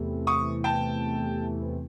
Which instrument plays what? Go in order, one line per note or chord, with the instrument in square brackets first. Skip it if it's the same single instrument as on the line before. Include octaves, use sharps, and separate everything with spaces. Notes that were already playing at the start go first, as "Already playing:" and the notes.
Already playing: [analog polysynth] E2 C3 E3 A3
[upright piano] C#6 D#6
G5 A5